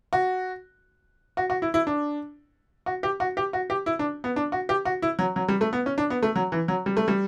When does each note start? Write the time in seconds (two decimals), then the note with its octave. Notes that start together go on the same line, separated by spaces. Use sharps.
0.13 F#4
1.37 F#4
1.50 F#4
1.62 E4
1.74 E4
1.87 D4
2.86 F#4
3.03 G4
3.20 F#4
3.37 G4
3.53 F#4
3.70 G4
3.86 E4
3.99 D4
4.24 B3
4.36 D4
4.52 F#4
4.69 G4
4.85 F#4
5.02 E4
5.19 F#3
5.36 F#3
5.48 G3
5.61 A3
5.73 B3
5.86 C#4
5.98 D4
6.10 B3
6.23 A3
6.36 F#3
6.52 E3
6.68 F#3
6.86 G3
6.97 A3
7.08 G3